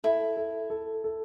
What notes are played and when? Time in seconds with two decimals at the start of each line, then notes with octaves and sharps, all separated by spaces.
0.04 E4 A4
0.37 A4
0.70 A4
1.04 A4